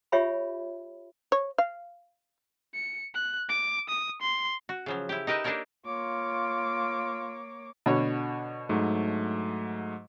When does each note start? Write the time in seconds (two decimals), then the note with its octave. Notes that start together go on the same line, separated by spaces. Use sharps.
0.12 F4 G4 C#5 E5 G#5 B5
1.32 C#5
1.58 F5
2.75 C#7
3.14 F#6
3.49 D6
3.89 D#6
4.22 C6
4.69 F#4
4.86 C#3 F3 F#3
5.09 E4 G4
5.27 D#4 G4 A#4 B4 D#5 E5
5.44 A#3 D4 D#4 A4 A#4 C#5
5.86 A#3 F4 C#5 D6
7.86 B2 D3 C#5
8.69 G#2 F#3 A3